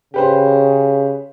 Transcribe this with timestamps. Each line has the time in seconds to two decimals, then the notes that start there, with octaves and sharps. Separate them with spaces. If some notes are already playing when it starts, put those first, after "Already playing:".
0.14 C#3 G4 B4 C5